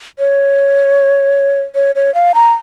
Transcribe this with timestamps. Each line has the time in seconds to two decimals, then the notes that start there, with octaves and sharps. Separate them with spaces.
0.19 C#5
1.75 C#5
1.95 C#5
2.15 F5
2.35 A#5